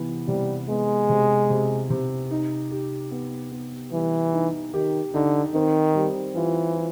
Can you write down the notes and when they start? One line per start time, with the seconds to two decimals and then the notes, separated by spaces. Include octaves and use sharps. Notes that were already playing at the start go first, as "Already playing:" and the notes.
Already playing: C3 E3 B3
0.28 C3 G3
0.69 G#3 B3
1.09 C3
1.50 C3
1.90 C3
2.31 D#4
2.71 G4
3.11 B3
3.52 B3
3.92 E3 G3
4.33 D#4
4.73 D#3 G4
5.14 D3 D#4
5.54 D#3 C4
5.95 G3
6.35 E3 F4
6.76 F4